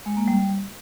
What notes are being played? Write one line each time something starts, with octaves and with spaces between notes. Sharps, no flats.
G#3
A#3
G3